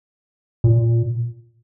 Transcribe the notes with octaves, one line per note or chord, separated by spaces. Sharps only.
A#2